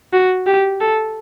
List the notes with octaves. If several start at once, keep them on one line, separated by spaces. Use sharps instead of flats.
F#4
G4
A4